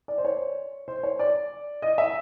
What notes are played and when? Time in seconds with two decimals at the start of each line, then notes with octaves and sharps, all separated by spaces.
0.08 D5
0.18 C5
0.25 C#5
0.88 C5
1.03 C#5
1.19 D5
1.82 D#5
1.98 E5